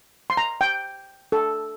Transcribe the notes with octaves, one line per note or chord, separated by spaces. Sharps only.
C6
A#5
G5
A4